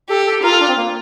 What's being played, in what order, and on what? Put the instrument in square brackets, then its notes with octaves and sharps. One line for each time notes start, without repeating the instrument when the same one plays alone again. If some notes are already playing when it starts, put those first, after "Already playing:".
[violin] G4 [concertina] A4
[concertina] A4
[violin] F4 [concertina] A#4
[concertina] A4
D4
C4
A#3